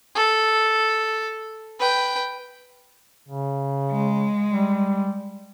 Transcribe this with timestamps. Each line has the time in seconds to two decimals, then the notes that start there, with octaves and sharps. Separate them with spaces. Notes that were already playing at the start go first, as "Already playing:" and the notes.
0.15 A4
1.79 B4 G5
3.29 C#3
3.92 G#3
4.51 G3